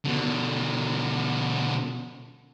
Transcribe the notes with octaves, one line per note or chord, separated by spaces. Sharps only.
B2 D3